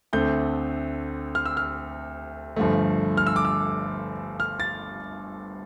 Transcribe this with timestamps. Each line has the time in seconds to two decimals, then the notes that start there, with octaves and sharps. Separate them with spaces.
0.13 D2 D3 A3 C4 G6
1.35 F6
1.46 E6
1.57 F6
2.56 G1 G2 F3 A3
3.17 F6
3.27 E6
3.36 D6
3.45 E6
4.40 F6
4.60 A6